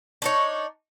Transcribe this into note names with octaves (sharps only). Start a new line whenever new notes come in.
D4 D#4 C#5